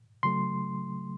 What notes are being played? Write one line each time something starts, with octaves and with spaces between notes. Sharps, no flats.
C#3 F#3 A3 C6